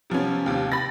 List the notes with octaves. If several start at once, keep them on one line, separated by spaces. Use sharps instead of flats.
C3 F3 B3 C#4
D#2 C3
B5 A6 A#6